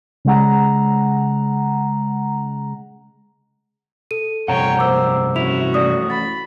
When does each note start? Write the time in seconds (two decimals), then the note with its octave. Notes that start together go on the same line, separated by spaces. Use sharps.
0.25 C#3 G#3 F#5 A#5
4.11 A4 D#7
4.48 G2 C3 F3 C#5 F#5 G5 A#5
4.79 A#3 C5 D6 E6
5.36 C#4 E4 F#4 F7
5.74 A2 E3 D5 D#6
6.10 B5 A6